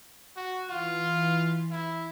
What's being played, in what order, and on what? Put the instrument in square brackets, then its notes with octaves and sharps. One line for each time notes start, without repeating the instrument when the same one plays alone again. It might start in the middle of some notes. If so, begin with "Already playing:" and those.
[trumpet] F#4
[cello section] E3 [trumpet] F4
[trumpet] E4